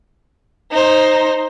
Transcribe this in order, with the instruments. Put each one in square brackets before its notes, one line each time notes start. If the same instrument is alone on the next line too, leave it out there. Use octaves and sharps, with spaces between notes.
[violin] D#4 C5